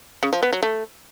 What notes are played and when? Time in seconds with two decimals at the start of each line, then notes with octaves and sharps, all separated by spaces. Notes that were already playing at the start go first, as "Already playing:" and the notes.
0.23 C#3
0.33 F3
0.43 B3
0.53 F#3
0.63 A3